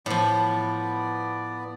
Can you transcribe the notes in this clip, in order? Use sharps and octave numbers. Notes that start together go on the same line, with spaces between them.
A2 F3 B3 D5